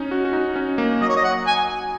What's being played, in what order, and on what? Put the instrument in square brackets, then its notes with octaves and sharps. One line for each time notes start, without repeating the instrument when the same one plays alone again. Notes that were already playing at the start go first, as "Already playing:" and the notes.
Already playing: [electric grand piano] C#4 D#4
F#4
F#4
D#4
C#4
A#3
[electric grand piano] F#3 [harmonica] D#5
[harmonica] C#5
D#5
F#5
G#5